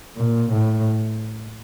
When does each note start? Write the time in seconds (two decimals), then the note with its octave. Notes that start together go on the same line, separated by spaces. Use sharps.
0.17 A#2
0.53 A2